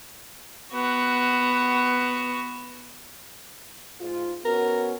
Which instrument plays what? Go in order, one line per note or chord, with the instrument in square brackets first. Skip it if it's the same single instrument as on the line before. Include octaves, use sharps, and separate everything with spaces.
[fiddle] B3 F#4
[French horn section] G#2 F4
[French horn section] B3 C#4 F#4 [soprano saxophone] A#4